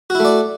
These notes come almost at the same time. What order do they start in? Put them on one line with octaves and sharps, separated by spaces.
F#4 E4 A3 D5